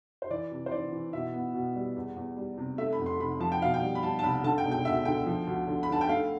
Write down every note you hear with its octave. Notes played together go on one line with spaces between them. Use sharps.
C5
E3 D5
C3
C5
E3 D5
E3
B2 E5
B3
B2
G3
E2
E2
G3
C3
A3 E5
B5
F2
C6
C3 B5
F3 A5
G5
B2 F5
G5
G3
B5
G3 A5
A5
C2 B5
D3 A5
G5
E1
G5
D2 E5
D3 G5
F3
D2
D3
B5
D3 A5
G5
A3 F5